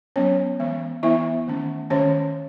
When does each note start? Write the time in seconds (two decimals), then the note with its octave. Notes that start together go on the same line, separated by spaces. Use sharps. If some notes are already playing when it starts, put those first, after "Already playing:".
0.16 F#3 B3 C#4 C#5
0.60 E3 G#3 B3
1.03 E3 B3 E4 E5
1.47 D#3 A3 C#4
1.90 D#3 G#3 C#4 C#5